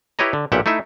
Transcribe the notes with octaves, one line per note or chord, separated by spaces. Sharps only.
E4 G4 B4 C#5 D#5 A#5
D3
B1 A#2 G4 E5 F#5
A3 D#4 E4 E5